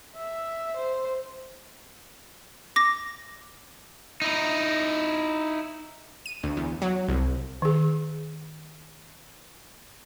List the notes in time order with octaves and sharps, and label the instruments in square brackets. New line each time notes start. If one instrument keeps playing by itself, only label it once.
[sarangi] E5
C5
[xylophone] D6 A#6
[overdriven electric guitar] D#4 E4
[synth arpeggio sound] D#7
D2
E2
F#3
C2
[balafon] D#3 G#4